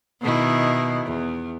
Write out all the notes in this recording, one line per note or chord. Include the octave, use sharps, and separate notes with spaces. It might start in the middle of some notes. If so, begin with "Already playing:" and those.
B2 D#3 E4
E2